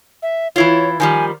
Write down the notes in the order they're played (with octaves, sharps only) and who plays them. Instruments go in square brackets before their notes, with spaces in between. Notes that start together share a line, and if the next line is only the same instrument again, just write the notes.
[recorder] E5
[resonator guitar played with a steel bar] E3 E4 F4 [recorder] C#5
[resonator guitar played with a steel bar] D#3 F3 G3 [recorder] G#5